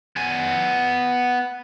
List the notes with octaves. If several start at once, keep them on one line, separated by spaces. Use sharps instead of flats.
B3 G#5